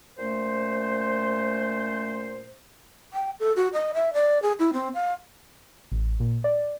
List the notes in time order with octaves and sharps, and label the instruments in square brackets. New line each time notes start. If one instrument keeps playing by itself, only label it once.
[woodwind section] A#2 A3 C#4 C5
[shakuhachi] G5
A4
F#4
D#5
E5
D5
G#4
E4
C4
F5
[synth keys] A1
A#2
D5